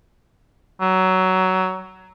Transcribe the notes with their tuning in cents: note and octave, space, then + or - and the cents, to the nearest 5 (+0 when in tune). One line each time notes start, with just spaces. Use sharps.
F#3 +15